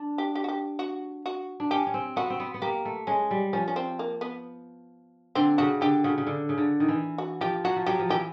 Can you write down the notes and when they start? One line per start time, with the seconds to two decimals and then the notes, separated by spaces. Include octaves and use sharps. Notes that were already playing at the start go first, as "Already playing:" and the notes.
Already playing: D4
0.18 G4
0.35 G4
0.44 F#4
0.48 G4
0.79 F#4
1.26 F#4
1.60 D4
1.71 C#4 G4
1.87 C#4
1.94 C4
2.16 B3 F#4
2.30 C4
2.40 B3
2.54 B3
2.62 A#3 G4
2.85 A3
3.07 G#3 C#4
3.31 G3
3.53 F3 C#4
3.68 C#4
3.76 C4
3.99 A#3
4.21 B3
5.35 D3 C4
5.58 C#3 F#4
5.81 D3 G4
6.04 C#3 F#4
6.18 C#3
6.27 D3
6.49 C#3
6.58 D3
6.80 D#3
6.88 E3
7.18 F#4
7.41 F3 G4
7.64 F#3 F#4
7.76 F3
7.86 F#3 G4
7.99 F3
8.09 E3 G4